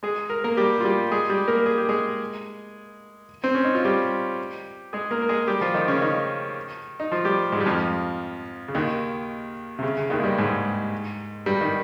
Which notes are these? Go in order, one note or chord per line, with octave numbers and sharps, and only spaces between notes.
G#3 G#4
A#4
A#3 A#4
G3 G4
F4
G3 G4
G#3 G#4
G3 G4
A#3 A#4
G#4
G4
G#3 G#4
C4
C#4
D#4
F4
G3 G4
G#3 G#4
A#3 A#4
A#4
G#3 G#4
G3 G4
F3 F4
D#3 D#4
C#3 C#4
D#3 D#4
D#4
F3 F4
G3 G4
G#2 G#3
G3
F2 F3
C#3
D#2 D#3
C3
C#3
C#3
D#2 D#3
G#3
G2 G3
G#2 G#3
G2 G3
D#3